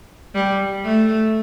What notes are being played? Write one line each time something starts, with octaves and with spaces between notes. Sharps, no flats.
G3
A3